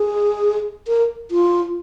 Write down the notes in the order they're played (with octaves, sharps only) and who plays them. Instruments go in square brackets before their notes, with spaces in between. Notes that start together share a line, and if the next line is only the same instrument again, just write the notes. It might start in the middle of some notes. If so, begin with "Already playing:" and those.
Already playing: [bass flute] G#4
A#4
F4